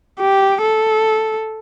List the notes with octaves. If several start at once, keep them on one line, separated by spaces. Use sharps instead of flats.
G4
A4